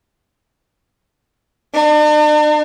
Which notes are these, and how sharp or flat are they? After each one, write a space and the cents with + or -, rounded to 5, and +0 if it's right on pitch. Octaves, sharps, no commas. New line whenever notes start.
D4 +45